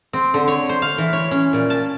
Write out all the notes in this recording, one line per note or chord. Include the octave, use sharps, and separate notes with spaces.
C4
D3
C#5
C5
F5
E3
C#5
C#4
A#2
A5